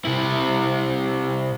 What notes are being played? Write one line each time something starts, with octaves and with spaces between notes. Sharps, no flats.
C3 E4